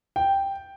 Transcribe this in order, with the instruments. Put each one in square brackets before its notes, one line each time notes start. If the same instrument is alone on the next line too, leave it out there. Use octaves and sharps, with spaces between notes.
[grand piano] G5